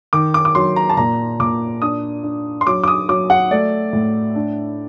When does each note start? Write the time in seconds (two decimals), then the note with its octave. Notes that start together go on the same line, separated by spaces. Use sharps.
0.13 D#3 D6
0.34 D6
0.45 D6
0.55 F#3 C6
0.76 A#5
0.89 A5
0.97 A#2 A#5
1.40 A#2 D6
1.82 D4 D#6
2.24 D4
2.61 C6
2.67 F#3 D6
2.84 D6
2.88 D#6
3.09 F#3 D6
3.30 F#5
3.51 A3 D5
3.93 A2
4.36 D4